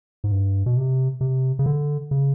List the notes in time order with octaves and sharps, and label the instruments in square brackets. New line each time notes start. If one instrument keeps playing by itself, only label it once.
[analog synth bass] G#2
G2
B2
C3
C3
C#3
D3
C#3